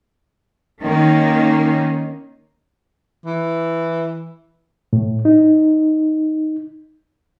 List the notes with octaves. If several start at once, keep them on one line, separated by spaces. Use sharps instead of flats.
D#3 A#3 C#4
E3
A2
D#4